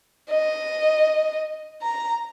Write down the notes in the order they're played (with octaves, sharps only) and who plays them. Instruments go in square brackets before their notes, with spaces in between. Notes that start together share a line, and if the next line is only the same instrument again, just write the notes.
[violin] D#5
A#5